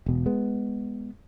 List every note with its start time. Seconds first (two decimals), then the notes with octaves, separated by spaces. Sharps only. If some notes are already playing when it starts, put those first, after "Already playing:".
0.06 E1 B2
0.26 G#3 B3